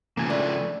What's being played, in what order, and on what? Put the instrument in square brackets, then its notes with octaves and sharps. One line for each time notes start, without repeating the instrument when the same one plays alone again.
[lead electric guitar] C#3 F3 [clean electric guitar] A#3 G#5
[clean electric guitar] A3 E4 [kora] D4